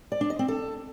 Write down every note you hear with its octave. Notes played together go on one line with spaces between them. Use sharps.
D5
D4
D#5
C4
A4